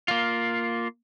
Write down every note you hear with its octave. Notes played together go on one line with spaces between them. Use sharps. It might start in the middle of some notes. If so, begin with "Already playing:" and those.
A#3 F4